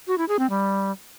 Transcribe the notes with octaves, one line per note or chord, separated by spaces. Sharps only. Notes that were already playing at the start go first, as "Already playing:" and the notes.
F#4
E4
G#4
C4
G3